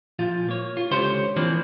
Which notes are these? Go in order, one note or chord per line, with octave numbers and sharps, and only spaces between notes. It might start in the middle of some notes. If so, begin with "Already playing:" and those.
A#2 F3 F4
A#3 C#5
F4
C#2 D3 G4 C5 C#5 C6
E3 F3 A#3 C4 D4